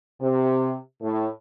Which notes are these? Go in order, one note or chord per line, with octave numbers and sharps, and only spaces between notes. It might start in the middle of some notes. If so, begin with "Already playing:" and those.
C3
A2